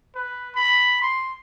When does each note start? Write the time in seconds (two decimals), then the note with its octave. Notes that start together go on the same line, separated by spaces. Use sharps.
0.15 B4
0.55 B5
1.02 C6